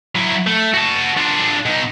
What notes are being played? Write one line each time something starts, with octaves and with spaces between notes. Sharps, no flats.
F#3 E4
A3
F#4 A5
D4 F4
B2 D#4